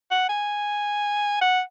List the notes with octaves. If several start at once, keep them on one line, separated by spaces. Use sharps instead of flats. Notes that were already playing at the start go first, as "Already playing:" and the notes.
F#5
G#5
F#5